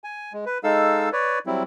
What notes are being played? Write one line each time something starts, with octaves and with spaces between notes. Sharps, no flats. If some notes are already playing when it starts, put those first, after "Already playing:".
G#5
G#3
B4
G#3 D#4 A4 F5 E6
B4 C#5 D5
F#3 G3 C4 E4